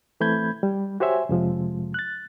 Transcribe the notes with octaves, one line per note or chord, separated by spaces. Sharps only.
E3 A3 C4 B5 G6 G#6
G3
F#4 G4 C5 C#5 E5 G#5
F2 C3 F3 G#3
F#6 A6